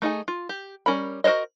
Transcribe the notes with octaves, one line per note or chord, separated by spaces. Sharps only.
A3 D#4 G#4 G#5
F4
G4
G3 C#4 A#4 B5
F#4 A#4 C5 C#5 D#5